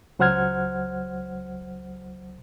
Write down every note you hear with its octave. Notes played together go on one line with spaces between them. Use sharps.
C#2 F#3 C5 F#5 F6 G#6